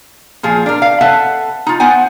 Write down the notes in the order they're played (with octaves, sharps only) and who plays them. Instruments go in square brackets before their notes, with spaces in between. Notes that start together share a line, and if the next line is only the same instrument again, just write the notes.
[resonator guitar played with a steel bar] A#2 F3 G#4
D4 A#4
F5
A4 B4 E5 F#5 A5
D#4 F4
B3 C5 F#5 G#5